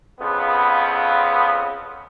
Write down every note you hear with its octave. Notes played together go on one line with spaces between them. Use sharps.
F2 C#3 B3